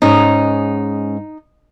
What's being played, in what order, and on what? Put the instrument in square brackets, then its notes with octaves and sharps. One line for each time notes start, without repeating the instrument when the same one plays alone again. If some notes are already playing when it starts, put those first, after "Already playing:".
[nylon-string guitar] G#2 C#4 G#4 [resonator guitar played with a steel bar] D#4